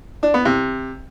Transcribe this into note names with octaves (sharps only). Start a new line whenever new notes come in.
D4
B3
C3